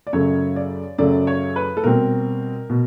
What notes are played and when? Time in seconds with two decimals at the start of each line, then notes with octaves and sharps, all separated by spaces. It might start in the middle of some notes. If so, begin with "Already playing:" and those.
0.07 D5
0.13 F#2 C#3 F#3 A3 C#5
0.56 D5
0.98 F#2 C#3 F#3 A3 D5
1.27 C#5
1.56 B4
1.77 A4
1.84 B2 G3 C4 A#4
2.70 B2